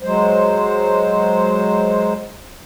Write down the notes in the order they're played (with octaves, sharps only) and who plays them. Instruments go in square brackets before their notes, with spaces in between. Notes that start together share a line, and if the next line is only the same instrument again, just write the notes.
[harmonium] F#3 G#3 C5